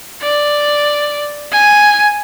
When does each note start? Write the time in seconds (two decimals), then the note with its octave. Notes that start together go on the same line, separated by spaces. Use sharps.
0.22 D5
1.52 G#5